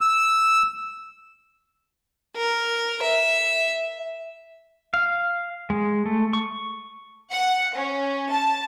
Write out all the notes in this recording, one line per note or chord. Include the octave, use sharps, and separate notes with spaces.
E6
A#4
E5
F5
G#3
A3
C#6
F#5
C#4
A5